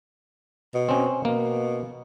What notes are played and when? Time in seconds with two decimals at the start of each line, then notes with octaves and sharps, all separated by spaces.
0.74 B2
0.89 C4 C#4
1.25 B2 A#3